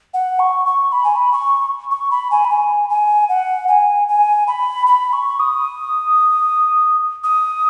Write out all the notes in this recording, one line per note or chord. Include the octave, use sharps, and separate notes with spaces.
F#5
C#6
C#6
B5
G#5
B5
C#6
C#6
B5
G#5
B5
G#5
G#5
F#5
G#5
G#5
B5
B5
C#6
D#6
D#6